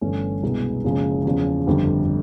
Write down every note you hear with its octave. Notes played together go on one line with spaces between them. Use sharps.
G1 G2 E3 A3 C#4
C2 B2 G#3 B3
F#1 F#2 C#3 F3 G#3
E2 C#3 F3
G1 F2 D3 G3